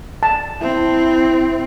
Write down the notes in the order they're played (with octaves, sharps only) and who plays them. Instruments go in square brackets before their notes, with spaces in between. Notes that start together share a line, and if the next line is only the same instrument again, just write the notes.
[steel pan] A5
[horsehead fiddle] C4 [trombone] E4